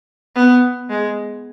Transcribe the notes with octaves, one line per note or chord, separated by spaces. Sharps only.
B3
G#3